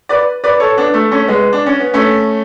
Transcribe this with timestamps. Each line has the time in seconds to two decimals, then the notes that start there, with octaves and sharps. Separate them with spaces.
0.09 B4 D5
0.44 B4 D5
0.60 A4 C#5
0.77 B3 D4
0.94 A3
1.11 A3 C#4
1.28 G#3 B3
1.53 D4
1.66 C#4
1.80 B3
1.94 A3 C#4